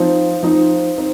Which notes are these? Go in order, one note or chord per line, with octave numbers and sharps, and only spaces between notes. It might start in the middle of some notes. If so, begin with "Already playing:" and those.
Already playing: F3 C4 D#4
F3 C4 D#4
C4 D#4